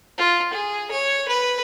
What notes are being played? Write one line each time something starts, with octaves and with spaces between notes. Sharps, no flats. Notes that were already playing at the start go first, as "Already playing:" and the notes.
F4
G#4
C#5
B4